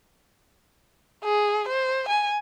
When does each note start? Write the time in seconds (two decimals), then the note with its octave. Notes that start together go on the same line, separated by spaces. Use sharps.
1.24 G#4
1.69 C5
2.09 G#5